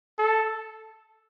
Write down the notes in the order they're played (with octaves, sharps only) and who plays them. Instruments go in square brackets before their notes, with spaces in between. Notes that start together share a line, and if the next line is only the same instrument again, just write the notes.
[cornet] A4